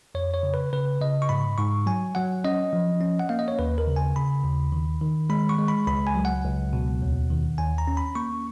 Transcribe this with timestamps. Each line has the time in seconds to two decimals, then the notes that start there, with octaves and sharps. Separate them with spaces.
0.15 F2 C#5
0.34 C#5
0.43 C#3
0.54 B4
0.73 C#3 B4
1.01 C#3 D#5
1.22 C#6
1.29 G#2 B5
1.58 G#2 C#6
1.86 F#3 G#5
2.15 F#3 F#5
2.44 C#4 D#5
2.73 F3
3.01 C#4
3.19 F#5
3.29 A#3 F5
3.39 D#5
3.48 C#5
3.59 D#2 B4
3.78 A#4
3.87 C#3
3.96 G#5
4.16 C#3 B5
4.44 D#2
4.72 D#3
5.01 D#3
5.30 G#3 B5
5.49 C#6
5.59 G#3
5.68 B5
5.87 C#2 B5
6.07 G#5
6.15 F#3
6.25 F#5
6.44 C#2
6.73 B2
7.02 D#2
7.31 D#3
7.58 D#2 G#5
7.78 A#5
7.87 C#4
7.97 B5
8.15 A#3 C#6